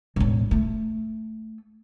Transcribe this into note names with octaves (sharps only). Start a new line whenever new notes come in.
E1 A1
A3